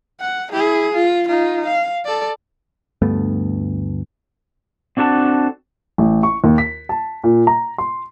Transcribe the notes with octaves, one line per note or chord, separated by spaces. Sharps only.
F#5
E4 G#4
F4
D#4 F4
F5
A4 D5
D2 G2 A3 B3
C4 D4 F#4 A4 A5
A1
C#6
D#2
B6
A5
A#2
A#5
C6